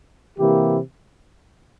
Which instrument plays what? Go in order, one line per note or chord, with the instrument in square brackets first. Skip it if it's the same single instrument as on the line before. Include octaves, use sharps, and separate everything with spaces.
[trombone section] C3 E3 A#3 E4 G4